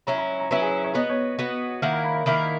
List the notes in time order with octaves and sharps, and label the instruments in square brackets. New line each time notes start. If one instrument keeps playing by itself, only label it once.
[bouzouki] F#3 C#4 E4 [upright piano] A#5
[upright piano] A#5
A#5
[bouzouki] F#3 C#4 E4 [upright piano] B4
[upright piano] G#4
C#5
[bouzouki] B3 F#4 B4 [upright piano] D#5
[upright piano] C#5
[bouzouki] B3 F#4 B4
[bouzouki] D#3 A#3 E4 A#4 [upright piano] F#5
[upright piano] A#5
B5
A#5
[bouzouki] D#3 A#3 E4 A#4 [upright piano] B5